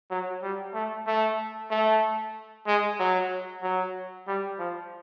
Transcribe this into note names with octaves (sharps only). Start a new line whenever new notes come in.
F#3
G3
A3
A3
A3
G#3
F#3
F#3
G3
F3